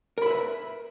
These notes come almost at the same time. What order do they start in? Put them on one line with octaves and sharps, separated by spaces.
A#4 B5 E5 B4